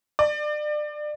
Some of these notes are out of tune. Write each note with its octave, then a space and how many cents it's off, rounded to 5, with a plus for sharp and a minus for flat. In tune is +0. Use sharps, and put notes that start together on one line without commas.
D5 +25